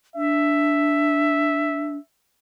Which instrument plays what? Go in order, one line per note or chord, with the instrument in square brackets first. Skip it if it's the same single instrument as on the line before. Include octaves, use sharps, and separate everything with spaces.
[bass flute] D4 [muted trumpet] E5